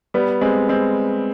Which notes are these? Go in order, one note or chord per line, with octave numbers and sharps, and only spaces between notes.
G3 B3
G#3 C4
G#3 C4